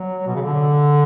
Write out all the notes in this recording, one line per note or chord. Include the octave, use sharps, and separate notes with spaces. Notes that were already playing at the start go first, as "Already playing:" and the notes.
Already playing: F#3
B2
C#3
D3